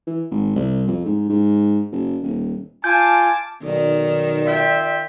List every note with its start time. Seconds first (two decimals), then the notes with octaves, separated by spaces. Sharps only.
0.07 E3
0.31 G#1
0.56 C2
0.88 F2
1.06 G#2
1.30 G#2
1.92 F#1
2.23 D#1
2.84 F4 G#5 A5 D6 G6
3.63 B1 D#3 D5
4.46 F4 E5 G5